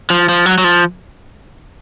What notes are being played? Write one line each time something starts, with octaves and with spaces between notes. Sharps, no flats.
F3
F3
F#3
F#3
F3